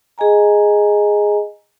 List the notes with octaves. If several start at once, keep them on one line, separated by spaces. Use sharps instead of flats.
G#4 D#5 G#5 A#5